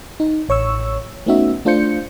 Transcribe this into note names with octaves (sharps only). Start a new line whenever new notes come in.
D#4
A1 C#5 C#6 E6
A3 B3 C#4 D#4 F#4 E5
A3 D4 F4 C5 G6 C#7